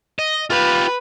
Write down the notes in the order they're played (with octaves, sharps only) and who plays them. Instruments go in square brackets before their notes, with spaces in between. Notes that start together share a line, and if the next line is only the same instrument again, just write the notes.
[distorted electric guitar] D#5
[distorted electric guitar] F4 G4 [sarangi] B4